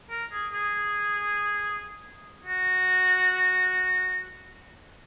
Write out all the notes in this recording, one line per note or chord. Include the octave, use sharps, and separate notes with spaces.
A#4
G#4
G#4
F#4